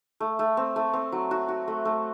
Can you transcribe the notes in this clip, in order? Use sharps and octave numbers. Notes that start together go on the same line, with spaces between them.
A3
A3
C4
A3
C4
F#3
F#4
F#4
A3
A3